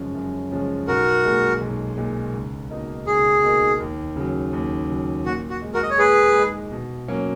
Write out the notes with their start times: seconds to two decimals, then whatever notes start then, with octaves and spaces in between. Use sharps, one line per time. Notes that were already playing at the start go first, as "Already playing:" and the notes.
Already playing: F#2 C#3 F3 G#3 C#4
0.15 F#2
0.51 C#3 F3 G#3 C#4
0.87 B1 F#4 A#4
1.24 A#2 G#3
1.61 B1
1.97 A#2 G#3
2.34 C#2
2.70 B2 A#3 D#4 A#4
3.06 C#2 G#4
3.43 B2 A#3 D#4 A#4
3.80 D#2
4.16 C#3 F#3
4.53 D#2
4.89 C#3 F#3
5.25 A#2 F#4
5.50 F#4
5.62 G#3 D#4
5.74 F#4 A#4
5.82 D#5
5.90 C#5
5.98 A#2 G#4 B4
6.35 G#3 D#4
6.72 B2
7.08 F#3 A#3 C#4